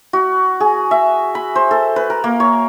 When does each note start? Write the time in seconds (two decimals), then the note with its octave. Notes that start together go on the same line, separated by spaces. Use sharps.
0.13 F#4
0.60 G#4
0.91 E5
1.35 B5
1.56 C5
1.71 A4
1.96 B4
2.10 A#4
2.24 A#3
2.40 C#5